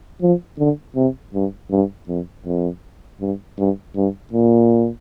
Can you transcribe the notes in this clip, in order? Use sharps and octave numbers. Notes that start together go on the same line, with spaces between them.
F3
D3
C3
G2
G2
F2
F2
G2
G2
G2
A#2